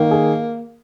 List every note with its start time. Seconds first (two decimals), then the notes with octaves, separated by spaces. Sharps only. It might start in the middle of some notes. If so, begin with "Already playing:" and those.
Already playing: D#3 A#3
0.11 G#4